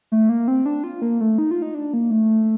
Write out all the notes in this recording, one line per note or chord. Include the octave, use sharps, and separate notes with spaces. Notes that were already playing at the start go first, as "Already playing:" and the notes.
A3
A#3
C4
D4
F4
A#3
A3
D#4
F4
D#4
D4
A#3
A3